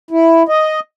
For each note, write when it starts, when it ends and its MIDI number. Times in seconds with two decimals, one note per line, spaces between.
0.11 0.43 64
0.49 0.80 75